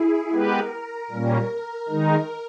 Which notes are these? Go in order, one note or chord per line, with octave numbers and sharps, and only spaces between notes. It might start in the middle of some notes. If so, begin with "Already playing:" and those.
Already playing: E4 G#4
G#3 B3 G4 A#4 B4
A#2 G3 A#3 C#4
D#3 G#3 D#4 A#4